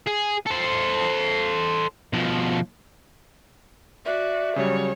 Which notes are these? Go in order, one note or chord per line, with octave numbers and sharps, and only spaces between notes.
G#4
A4 C5
B2 F3
F#4 D5 E5
C#3 F#3 G3 C#5